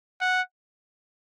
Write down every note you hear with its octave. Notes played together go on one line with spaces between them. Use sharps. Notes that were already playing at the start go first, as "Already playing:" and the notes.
F#5